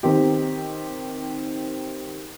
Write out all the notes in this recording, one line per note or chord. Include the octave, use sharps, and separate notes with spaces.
D#3 C4 G4